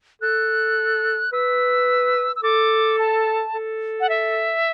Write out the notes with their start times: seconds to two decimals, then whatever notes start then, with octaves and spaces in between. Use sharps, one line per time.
0.22 A4 F#6
1.33 B4 E6
2.36 E6
2.43 A4 D6
2.99 A5
3.54 A4
4.00 F#5
4.09 E5